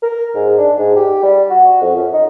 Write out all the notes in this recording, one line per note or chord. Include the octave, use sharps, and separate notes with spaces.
A#4
G#2
D4
G#2
G4
G3
F#4
F2
F#2
D#4